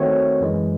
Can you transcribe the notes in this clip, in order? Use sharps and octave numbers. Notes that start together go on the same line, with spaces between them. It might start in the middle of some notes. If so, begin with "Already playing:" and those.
Already playing: D#3 A3 C4 F#4 C#5
F#2 E3 G#3